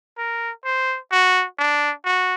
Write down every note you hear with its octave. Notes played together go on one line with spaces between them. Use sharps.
A#4
C5
F#4
D4
F#4